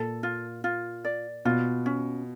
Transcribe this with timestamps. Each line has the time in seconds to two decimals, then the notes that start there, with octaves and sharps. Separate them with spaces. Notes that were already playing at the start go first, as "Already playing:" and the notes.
Already playing: A#2 A4
0.23 F4
0.64 F4
1.05 D5
1.45 B2 F4
1.86 C#4